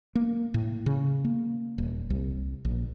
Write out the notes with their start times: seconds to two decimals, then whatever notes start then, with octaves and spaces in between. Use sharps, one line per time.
0.15 A#3
0.54 A2
0.86 C#3
1.25 A#3
1.78 D#1
2.10 C2
2.65 A#1